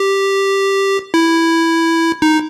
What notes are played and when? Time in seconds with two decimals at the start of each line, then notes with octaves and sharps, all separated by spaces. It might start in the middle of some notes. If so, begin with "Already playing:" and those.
Already playing: G4
1.14 E4
2.22 D#4